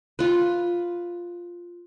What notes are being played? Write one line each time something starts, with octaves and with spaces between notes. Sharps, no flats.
F4 B4